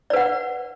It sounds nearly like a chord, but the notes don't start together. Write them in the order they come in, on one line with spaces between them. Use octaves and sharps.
D5 B4 F#5